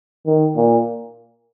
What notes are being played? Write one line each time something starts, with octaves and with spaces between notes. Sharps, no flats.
D#3
A#2